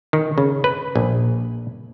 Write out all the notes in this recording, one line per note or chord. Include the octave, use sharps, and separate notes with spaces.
D#3
C#3
B4
A#1